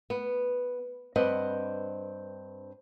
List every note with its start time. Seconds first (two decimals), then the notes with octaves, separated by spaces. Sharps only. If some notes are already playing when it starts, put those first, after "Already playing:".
0.10 B3
1.16 G2 C4 B4 D#5 F#5